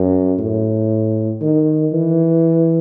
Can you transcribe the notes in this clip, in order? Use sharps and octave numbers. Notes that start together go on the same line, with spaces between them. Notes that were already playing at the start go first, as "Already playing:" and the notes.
Already playing: F#2
A2
D#3
E3